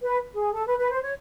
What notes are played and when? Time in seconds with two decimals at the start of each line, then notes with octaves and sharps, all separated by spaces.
0.01 B4
0.35 G#4
0.53 A4
0.66 B4
0.78 B4
0.91 C5
1.02 C#5